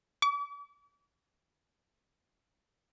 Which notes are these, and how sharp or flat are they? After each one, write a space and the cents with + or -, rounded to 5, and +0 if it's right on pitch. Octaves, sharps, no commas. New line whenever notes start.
D6 -40